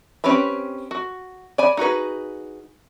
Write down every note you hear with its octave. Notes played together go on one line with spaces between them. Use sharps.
C4 C#4 G4 B4 B5
F#4
D5 G#5 B5
D#4 F#4 G#4 B4